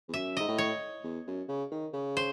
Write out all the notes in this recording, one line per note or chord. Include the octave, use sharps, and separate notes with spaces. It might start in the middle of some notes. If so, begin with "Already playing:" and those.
E2
F#2 E5
G#2 D#5
A2
C#5
E2
F#2
C#3
D#3
C#3
C5